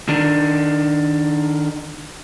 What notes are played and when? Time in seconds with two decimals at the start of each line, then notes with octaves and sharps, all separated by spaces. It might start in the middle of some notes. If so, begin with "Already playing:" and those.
0.09 D#3 D4